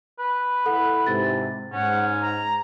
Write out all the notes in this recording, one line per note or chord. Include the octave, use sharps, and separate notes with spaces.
B4
E4 A4 F#5
G#2 C3 A6
G#2 C#4 F#5
A#5